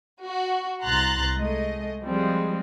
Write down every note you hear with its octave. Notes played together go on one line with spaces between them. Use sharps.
F#4
C2 A#5 C6 F#6 A6
G#3 A3 D#5
F3 G3 G#3 C4